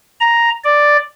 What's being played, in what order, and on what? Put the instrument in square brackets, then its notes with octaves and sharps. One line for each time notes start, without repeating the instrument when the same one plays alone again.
[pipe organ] A#5
D5